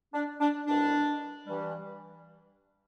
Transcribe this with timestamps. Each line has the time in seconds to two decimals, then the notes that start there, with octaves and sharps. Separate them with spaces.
0.14 D4
0.40 D4
0.67 C2 B2 G3 D4
1.46 G2 E3 G3